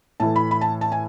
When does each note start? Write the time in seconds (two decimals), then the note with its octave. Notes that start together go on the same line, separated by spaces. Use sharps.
0.20 A2 E3 A3 A5
0.36 B5
0.51 B5
0.61 A5
0.81 A5
0.92 G#5